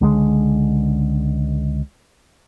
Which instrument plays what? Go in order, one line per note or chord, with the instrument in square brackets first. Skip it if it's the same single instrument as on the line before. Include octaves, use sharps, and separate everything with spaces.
[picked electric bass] C#2 D3 G3 G#3